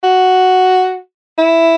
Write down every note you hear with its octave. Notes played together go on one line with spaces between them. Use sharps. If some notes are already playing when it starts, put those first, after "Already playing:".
F#4
E4